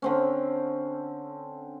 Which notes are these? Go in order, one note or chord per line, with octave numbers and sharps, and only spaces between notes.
D3 C4 C#4